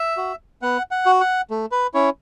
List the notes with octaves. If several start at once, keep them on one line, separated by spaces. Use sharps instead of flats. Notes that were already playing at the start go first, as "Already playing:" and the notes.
Already playing: E5
F#4
B3 F#5
F#5
F#4
F#5
A3
B4
C#4 E4 C#5